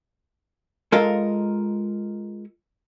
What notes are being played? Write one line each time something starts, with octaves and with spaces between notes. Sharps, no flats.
G#3 F4 A4 A#4 D#5 F5